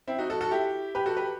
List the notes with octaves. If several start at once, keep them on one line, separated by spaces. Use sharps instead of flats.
C4 E4
D#4 F#4
F#4 A4
F#4 A4
E4 G4
G4 B4
F#4 A4
G4 B4